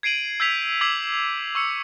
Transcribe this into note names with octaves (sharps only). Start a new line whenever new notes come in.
G#6 C7 D7 D#7 F#7
E6 G6 G#6 B6 F7
D6 E6 G#6 B6 C7 F#7
F7
C#6 E6 C#7